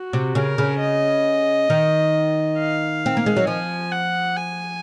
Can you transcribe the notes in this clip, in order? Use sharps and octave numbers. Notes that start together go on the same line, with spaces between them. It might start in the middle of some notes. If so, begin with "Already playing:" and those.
Already playing: F#4
C3
C#3 A#4
C#3
D#5
D#3
F5
C4
A#3
G#3
F#3
F3 G#5
F#5
G#5